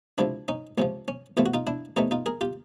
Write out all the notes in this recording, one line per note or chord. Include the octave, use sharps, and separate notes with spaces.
C#2 C3 F3 D4 E4
C#4 D#4
C#2 C3 F3 C#4
C#4
E2 C3 E3 A3 F4
F#4
D#4 F4
D4 E4
E2 C3 E3 A3 C#4 D#4
D#4 F4
G#4 A#4
F4 G4